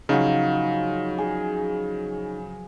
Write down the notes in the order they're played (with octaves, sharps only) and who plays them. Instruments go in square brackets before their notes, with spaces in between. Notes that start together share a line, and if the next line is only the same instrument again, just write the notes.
[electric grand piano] C#3 [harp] F3 F#3 [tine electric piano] D#4
[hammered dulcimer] G#4